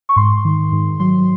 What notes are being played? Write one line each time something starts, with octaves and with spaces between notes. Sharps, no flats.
C#6
G#2 C6
D#3
G#2
F#3 C6